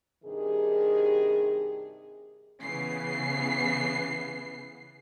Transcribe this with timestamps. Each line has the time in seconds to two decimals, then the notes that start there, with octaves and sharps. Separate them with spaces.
0.24 G2 C3 D#3 G#4
2.61 C#3 E3 B3 C7